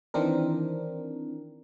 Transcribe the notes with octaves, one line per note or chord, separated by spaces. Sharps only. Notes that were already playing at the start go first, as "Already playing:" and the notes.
D#3 E3 C4 D4 A#4